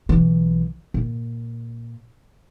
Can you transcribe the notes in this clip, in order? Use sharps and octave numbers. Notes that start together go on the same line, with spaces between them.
B1 E3
A#2